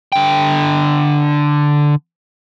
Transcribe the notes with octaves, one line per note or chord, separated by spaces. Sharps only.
D3 G5